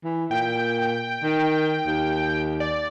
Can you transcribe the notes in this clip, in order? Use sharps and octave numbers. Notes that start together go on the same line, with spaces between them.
E3
A#2 G5
D#3
D#2
D5